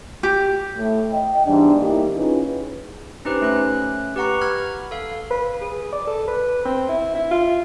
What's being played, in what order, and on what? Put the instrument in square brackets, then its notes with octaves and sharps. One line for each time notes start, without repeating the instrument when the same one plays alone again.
[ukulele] G4
[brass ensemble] A2
D#5 G5
G#2 E3 G3 B3 D4
A#3 D#4 E4 G4
C#4 D#4 F4 G#4 B4
[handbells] C#4 D#4 G4 B4 C5
A3 C#4 F#6
G4 B4 F#5 A#5 C#6
B5 F6 G#6
A4 F5
[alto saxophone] B4
G#4
D5
A4
B4
C4
E4
E4
F4